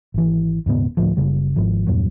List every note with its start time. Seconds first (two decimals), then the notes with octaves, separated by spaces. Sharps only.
0.14 G#1 E3
0.66 D#1 G#2 C#3 B3
0.97 D2 A2 F3
1.17 F#1 C#3 G3
1.56 G#1 G#2 F3
1.87 E2 G2 A#2 F#3